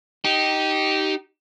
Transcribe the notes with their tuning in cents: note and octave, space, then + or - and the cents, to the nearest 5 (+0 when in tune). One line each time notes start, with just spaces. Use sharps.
D#4 +0 G4 -15